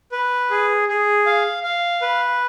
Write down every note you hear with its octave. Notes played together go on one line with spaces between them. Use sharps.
B4
G#4
G#4
F5
F5
B4